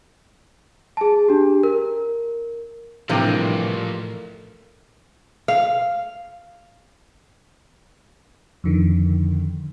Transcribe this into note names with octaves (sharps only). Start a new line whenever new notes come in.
G#4 A5
D4 G4
A#4
A1 G2 C3 E3 F3 A#3
F5
F2 D3 D#3